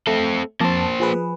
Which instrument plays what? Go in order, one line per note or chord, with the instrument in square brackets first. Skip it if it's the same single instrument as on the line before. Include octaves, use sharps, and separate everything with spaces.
[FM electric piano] A3 [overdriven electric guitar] C4 A4
[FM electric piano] F2 A5 [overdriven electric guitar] A#3 C5
[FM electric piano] F3 G#4 B4